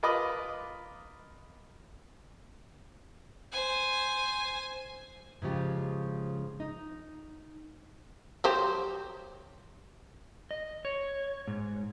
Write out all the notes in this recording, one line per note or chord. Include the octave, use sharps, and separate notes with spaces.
F4 A#4 B4 D#5 B5 D6
C5 G#5
G#2 C#3 F3 G4
D#4
F#3 G4 C5
D#5
C#5
G#2